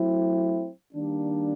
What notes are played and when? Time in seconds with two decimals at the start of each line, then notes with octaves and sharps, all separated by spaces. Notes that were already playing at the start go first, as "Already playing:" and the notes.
Already playing: F#3 A3 C4 E4
0.94 D#3 G3 A#3 D4